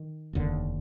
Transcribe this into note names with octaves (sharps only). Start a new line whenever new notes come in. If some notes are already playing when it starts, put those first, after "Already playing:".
Already playing: D#3
F1 D#2 D3